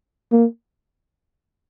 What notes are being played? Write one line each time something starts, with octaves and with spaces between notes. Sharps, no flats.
A#3